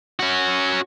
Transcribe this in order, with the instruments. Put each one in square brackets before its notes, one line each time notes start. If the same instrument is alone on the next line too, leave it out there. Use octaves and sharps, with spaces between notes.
[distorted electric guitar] C#4 F#4